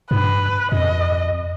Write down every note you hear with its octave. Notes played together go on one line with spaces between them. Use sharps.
G2 B4
F2 D#5